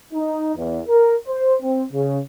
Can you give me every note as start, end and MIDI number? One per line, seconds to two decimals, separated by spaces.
0.14 0.54 63
0.56 0.80 40
0.88 1.15 70
1.27 1.55 72
1.62 1.84 60
1.93 2.19 49